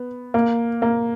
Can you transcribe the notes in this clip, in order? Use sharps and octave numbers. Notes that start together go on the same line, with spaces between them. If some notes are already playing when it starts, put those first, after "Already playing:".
Already playing: B3
A#3
A#3